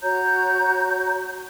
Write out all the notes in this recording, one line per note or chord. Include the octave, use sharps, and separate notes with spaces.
F#4 C#5 A#5 G6